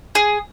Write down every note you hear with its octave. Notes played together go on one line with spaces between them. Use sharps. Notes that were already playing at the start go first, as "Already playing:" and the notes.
G#4